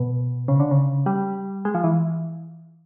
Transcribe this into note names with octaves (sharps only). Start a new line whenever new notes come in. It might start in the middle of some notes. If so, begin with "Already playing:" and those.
Already playing: B2
C#3
D3
C#3
G3
G#3
F3
E3